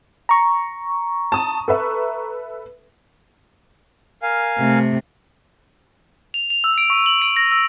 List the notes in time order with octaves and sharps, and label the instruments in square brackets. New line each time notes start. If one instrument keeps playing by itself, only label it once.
[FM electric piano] A#5 C#6
[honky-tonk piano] A5 D#6
A4 B4 E5
[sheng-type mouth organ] A#4 F5 G#5
[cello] C3 A3
[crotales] F7
F7
E6
D7
C#6
F#7
D7
A#6
E6